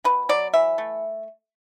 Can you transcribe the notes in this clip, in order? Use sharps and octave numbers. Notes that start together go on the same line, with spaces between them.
B2 B4
F#3 D5
E3 E5
A3